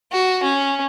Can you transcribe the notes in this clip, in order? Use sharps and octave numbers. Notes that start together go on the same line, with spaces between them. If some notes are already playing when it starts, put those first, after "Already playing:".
F#4
C#4